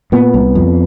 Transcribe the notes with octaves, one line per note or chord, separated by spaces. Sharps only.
A#2 B3
C2
F2